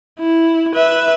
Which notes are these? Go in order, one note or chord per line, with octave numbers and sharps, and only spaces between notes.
E4
B4 E5